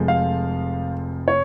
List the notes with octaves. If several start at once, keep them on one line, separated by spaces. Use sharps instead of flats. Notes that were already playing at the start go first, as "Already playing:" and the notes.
Already playing: F1 F2 C3 F3 G#3
F5
C#5